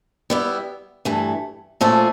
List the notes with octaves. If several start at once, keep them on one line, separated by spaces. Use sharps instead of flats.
G3 B3 E4
G2 E3 A3
A#2 F3 A3 C#4 F4